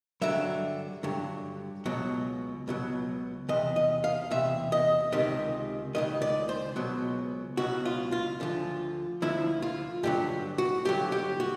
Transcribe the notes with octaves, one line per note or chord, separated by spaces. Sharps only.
G2 D3 F#3 E5
G2 D3 F#3
C#2 B2 F#3
C#2 B2 F#3
E2 C3 D#5
D#5
F5
E2 C3 E5
D#5
C#2 C3 D#3 D#5
C#2 C3 D#3 D#5
D5
C5
C#2 B2 F#3
C#2 B2 F#3 F#4
F4
F4
D2 D3 F3
D2 D3 F3 E4
F4
G2 D3 F#3 G4
F#4
G2 D3 F#3 G4
G4
F#4